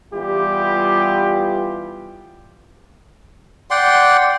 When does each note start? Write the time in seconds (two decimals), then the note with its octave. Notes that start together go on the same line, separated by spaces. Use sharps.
0.12 E3 G3 B3 F4 G4
3.71 D5 F#5 G5 C6